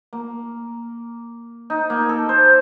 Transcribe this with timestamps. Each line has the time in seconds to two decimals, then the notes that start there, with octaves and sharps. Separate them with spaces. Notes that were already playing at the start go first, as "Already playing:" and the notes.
0.13 A#3
1.70 D#4
1.90 A#3
2.09 A4
2.29 C5